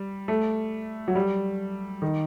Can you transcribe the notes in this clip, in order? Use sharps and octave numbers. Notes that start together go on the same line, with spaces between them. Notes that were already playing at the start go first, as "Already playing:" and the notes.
Already playing: G3
A3
F#3
G3
D#3